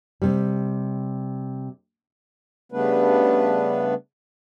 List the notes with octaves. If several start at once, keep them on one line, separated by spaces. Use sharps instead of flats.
C3 G3
C#3 G3 A3 B3 D4 B4